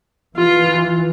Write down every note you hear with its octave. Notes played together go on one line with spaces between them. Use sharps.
E3 F4